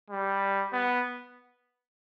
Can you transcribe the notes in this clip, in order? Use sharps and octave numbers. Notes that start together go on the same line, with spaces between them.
G3
B3